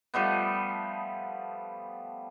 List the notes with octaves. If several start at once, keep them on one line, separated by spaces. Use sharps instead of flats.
F3 G3 A3 B3